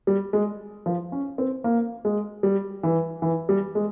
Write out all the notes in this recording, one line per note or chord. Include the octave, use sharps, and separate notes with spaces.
G3
G#3
F3
C#4
C4
A#3
G#3
G3
E3
E3
G3
G#3